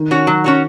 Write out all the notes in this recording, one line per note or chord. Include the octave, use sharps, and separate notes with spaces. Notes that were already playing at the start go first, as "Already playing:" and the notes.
Already playing: D#3
C#4 F#4 C#5
F#3
C#4 F#4 C#5